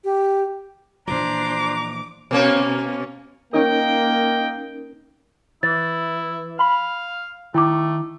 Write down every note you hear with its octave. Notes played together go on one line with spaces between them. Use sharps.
G4
A#2 E3 F3 D4 C5 A#5 D6
B2 A#3 C#4
A#3 C#4 D#4 A#4 D#5 G5
E3 E4 A6
F5 B5
D#3 A3 E4 D6